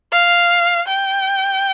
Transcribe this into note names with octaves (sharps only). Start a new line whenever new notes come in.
F5
G5